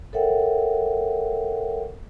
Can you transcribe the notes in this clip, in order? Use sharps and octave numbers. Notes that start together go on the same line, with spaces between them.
A4 A#4 C#5 E5 F#5 G5